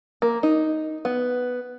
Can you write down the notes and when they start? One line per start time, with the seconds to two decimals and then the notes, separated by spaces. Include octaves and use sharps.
0.22 A#3
0.43 D#4
1.05 B3